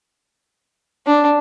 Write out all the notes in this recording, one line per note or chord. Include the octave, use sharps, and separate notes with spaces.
D4